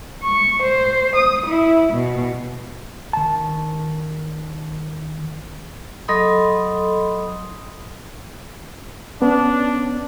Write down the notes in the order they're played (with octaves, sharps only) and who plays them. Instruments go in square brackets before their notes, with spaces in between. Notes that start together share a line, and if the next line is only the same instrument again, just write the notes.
[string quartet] C#6
C5
D#6
E4
B2
[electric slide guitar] D#3 A5
[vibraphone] F#3 A4 D#5 B5 C6 D#6
[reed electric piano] B3 [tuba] C#4 [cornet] D4